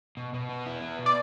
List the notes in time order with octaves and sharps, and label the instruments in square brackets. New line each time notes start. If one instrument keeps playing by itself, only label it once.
[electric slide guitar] B2
B2
B3
E4
B3
B2
[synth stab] D5